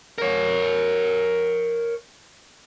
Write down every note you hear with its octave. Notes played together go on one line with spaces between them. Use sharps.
A#4 C#5